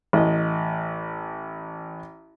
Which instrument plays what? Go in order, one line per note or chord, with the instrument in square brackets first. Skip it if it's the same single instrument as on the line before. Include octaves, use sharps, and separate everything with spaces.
[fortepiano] A1 D#5